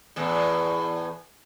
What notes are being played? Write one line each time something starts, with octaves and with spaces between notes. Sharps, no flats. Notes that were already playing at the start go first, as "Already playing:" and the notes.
E2 A2